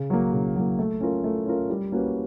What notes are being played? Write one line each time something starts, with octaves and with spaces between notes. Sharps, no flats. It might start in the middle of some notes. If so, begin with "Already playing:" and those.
Already playing: C#3
F#3 A#3
C#3
F#3 A#3
A3
C#4 F4 A#4
A3
C#4 F4 A#4
G3
A#3 C#4 F#4 B4